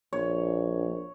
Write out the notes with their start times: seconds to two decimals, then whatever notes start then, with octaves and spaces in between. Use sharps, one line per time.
0.13 A#1 C#5